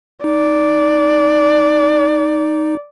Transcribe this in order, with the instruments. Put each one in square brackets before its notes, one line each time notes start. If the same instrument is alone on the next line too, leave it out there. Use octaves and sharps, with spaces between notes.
[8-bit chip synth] D#4 [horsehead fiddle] D5